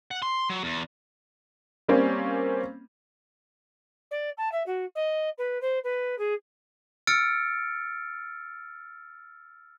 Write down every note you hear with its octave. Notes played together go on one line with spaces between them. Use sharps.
F#5
C6
F#3
E2
G3 A#3 C4 C#4
D5
A5
E5
F#4
D#5
B4
C5
B4
G#4
E6 F6 A6 C#7 D7